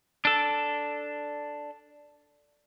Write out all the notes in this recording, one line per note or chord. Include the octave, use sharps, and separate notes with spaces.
D4 A4